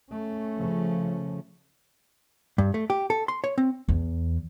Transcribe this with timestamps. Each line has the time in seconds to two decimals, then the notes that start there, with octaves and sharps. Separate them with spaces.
0.11 A3 C#4
0.58 C#3 F3
2.58 G2
2.74 A3
2.90 G4
3.10 A4
3.28 C6
3.44 C#5
3.58 C4
3.88 E2